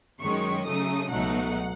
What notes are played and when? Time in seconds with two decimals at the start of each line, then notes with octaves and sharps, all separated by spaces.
0.22 F#2 D#3 G#3 C#4 C#6
0.66 C#3 F#3 A3 D#4 D#6
1.10 C#2 B2 F#3 A3 D#4 F#5